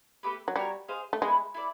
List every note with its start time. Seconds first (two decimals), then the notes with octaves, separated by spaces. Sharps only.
0.23 A3 D4 G4 B4
0.48 F#3
0.56 G3 F#4 A#4 C#5
0.88 D#4 G#4 C5 F5
1.13 A3
1.22 G#3 B3 E4 G#4
1.54 E4 A4 D5